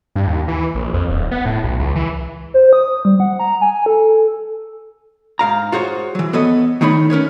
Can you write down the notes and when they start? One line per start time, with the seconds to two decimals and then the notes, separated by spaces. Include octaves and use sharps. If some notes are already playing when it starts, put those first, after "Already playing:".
0.16 G2
0.27 D#2
0.48 E3
0.75 A#1
0.94 F2
1.10 D#1
1.31 B3
1.46 A2
1.64 B1
1.80 C#2
1.96 E3
2.54 C5
2.73 D#6
3.05 G3
3.20 F#5
3.39 A#5
3.61 G#5
3.86 A4
5.39 G#2 F5 A#5
5.72 F4 F#4 G#4 C5 C#5
6.15 E3 F#3
6.33 B3 A4 B4 C#5 D#5
6.81 A2 D#3 A3 D#4 C#5 B5
7.10 C#4 A#4 B4 C#5